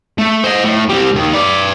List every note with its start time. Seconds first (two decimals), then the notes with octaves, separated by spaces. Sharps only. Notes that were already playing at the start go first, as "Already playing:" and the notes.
0.19 A3
0.44 C5 D#5
0.64 A2
0.89 G3 C4
1.15 D#2 D#3
1.34 B4 D5